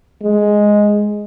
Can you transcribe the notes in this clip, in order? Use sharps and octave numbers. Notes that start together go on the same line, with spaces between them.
G#3